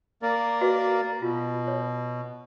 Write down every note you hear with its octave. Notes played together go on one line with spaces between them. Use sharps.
A#3 A#4 D5
F#4 B4 D#5
B2 F4
C#5